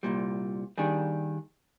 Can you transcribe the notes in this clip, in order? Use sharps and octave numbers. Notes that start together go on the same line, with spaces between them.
C2 A#2 G3
D#2 D#3 G3 D4 G#4